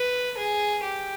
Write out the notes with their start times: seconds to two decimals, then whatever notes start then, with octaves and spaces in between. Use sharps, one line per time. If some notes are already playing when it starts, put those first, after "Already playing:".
Already playing: B4
0.37 G#4
0.83 G4